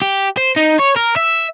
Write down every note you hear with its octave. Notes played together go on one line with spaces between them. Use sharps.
G4
C5
D#4
C#5
A#4
E5